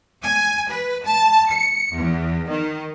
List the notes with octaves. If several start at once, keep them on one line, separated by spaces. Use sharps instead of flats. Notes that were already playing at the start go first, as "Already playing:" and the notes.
G#5
B4
A5
C#7
E2
D#3